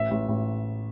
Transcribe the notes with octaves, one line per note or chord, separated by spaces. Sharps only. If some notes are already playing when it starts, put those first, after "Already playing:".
Already playing: A1 E5
A1
A1